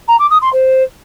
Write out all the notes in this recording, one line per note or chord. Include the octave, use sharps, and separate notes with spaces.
A#5
D6
D#6
C6
C5